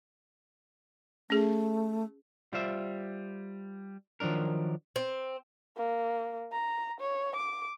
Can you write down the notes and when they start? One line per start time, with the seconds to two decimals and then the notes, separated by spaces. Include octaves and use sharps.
1.30 A3 C#4 G#4
2.53 G3 F4 C5 E5
4.20 D#3 F3 F#3 D4 A#4
4.96 C4
5.77 A#3
6.52 A#5
7.00 C#5
7.35 D6